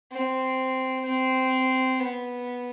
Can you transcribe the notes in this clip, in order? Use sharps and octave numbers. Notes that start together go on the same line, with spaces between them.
C4
C4
B3